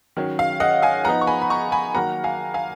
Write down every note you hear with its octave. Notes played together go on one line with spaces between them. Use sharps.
D#3 F#3 C#4
F5
D#5 F#5
F5 G#5
F3 B3 D#4 F#5 A#5
C#6
G#5 B5
B5
A#5 C#6
G#5 B5
D#3 F#3 A#3 F#5 A#5
F5 G#5
F5 G#5